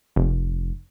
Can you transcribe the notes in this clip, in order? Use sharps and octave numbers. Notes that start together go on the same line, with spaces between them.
F1